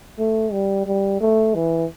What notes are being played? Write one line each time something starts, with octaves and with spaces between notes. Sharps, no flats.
A3
G3
G3
A3
E3